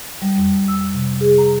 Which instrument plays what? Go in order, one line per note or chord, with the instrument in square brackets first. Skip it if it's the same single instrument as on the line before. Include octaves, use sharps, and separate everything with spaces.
[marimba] G3
F2
E6
C3
G#4
A#5